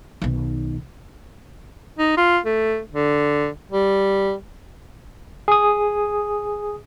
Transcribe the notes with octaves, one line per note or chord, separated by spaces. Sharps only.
B1 D#3
D#4
F4
A3
D3
G3
G#4 D#6